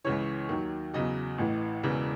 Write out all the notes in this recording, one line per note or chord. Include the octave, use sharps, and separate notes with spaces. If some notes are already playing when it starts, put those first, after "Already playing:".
C#2 C#3 E3 C#5
D#2 D#3 F#3
E2 C#3 F#3 D#5
A1 A2 E3
E1 E2 C#3 E3